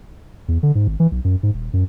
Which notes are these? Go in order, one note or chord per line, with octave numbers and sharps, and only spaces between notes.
E2
D3
G#2
G#1
E3
B1
F#2
G#2
D#1
F#2